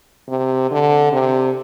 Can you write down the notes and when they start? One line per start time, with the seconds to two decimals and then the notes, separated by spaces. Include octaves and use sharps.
0.29 C3
0.71 D3
1.12 C3